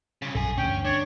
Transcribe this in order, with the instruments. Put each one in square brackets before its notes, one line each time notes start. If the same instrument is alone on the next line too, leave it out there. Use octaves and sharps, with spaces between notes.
[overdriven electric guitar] C2 C#3
[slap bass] A#1 F#2 [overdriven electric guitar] A4 G#5
[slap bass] D2 G2 E3 [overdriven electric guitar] C#4 [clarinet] G5
[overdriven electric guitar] D4 [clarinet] C#5